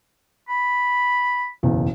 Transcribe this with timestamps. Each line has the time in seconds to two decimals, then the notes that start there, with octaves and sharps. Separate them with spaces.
0.49 B5
1.63 F#1 B1 E2